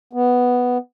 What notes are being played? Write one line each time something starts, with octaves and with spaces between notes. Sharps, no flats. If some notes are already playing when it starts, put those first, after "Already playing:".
B3